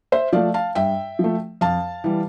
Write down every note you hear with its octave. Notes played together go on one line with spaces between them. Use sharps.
C5 E5
F3 A3 D5 F5
F5 A5
G2 E5 G5
F3 A3
F2 F5 A5
E3 G3